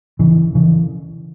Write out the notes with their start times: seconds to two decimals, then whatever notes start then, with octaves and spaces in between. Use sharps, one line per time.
0.19 C#3 E3
0.55 C#3 E3